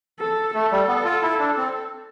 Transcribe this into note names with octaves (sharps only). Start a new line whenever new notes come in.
A4
A3 A4
G3
B3
F4
E4
D4
C4